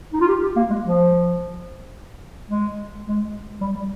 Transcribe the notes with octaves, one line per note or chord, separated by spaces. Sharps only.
D#4
F4
G4
G4
A#3
G#3
F3
G#3
G#3
G3
G3